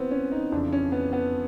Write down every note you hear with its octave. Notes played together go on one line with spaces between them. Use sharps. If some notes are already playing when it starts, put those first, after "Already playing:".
Already playing: E3 B3 C4
C#4
D#4
F2 C#3 E3 D4
C#4
B3
B3